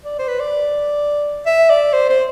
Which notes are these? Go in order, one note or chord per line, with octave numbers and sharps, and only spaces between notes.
D5
C5
B4
D5
E5
D5
C5
C5